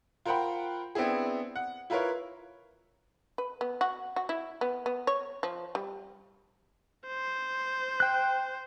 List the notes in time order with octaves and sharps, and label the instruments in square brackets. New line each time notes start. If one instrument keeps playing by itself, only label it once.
[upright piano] F4 A#4 C5 F#5 G5 B5
B3 C4 D4 E4 G#4
F#5
E4 F4 A#4 B4 C#5 F5
[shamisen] B4
B3
F#4
F#4
E4
B3
B3
C#5
F3
G3
[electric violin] C5
[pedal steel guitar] G5 F#6